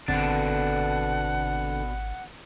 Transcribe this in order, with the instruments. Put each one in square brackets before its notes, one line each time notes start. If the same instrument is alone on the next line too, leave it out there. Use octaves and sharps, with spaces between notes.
[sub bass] G#1 [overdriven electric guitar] B2 D4 [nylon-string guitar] D3 C4 [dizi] F#5